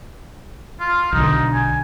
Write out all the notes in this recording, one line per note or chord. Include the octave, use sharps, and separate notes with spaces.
F4
B1 D3 D#4
G#5